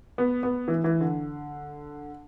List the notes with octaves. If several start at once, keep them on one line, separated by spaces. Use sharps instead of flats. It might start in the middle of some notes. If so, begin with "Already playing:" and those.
B3
B3
E3
E3
D3